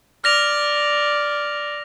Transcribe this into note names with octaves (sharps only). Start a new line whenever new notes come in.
D5 F6 A#6 F7